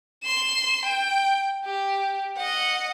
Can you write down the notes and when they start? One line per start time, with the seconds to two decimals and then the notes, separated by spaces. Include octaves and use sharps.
0.24 C6 E7
0.86 G5
1.65 G4
2.38 D#5 F#5